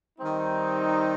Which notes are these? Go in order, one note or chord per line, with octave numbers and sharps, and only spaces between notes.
D#3 G3 C4 D#4